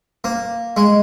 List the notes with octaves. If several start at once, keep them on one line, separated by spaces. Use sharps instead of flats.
A#3
G#3